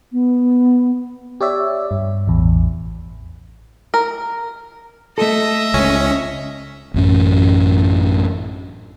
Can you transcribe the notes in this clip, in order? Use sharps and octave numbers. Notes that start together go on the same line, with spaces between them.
B3
G4 C#5 D5 E5
G2
A1 E2
A#4
A3 A4 D#5 E5
C#2 C#4
A1 F#2 C#4